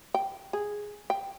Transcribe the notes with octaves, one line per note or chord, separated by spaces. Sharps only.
G5
G#4
G5